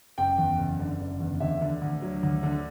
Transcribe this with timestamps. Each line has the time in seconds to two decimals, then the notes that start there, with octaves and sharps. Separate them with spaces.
0.18 F#1 G5
0.38 E2
0.58 F#1
0.79 D3
1.00 F#1
1.20 E2
1.40 D2 E5
1.61 D3
1.82 D2
2.02 F#3
2.23 D2
2.43 D3